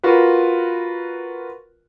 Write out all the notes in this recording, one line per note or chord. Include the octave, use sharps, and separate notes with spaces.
F4 F#4 A#4 B4